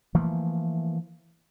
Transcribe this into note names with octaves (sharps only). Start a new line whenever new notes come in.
E3 F3 A3 A#3